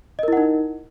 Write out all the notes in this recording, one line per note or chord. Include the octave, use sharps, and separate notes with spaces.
D#4 E4 A#4 D#5 F#5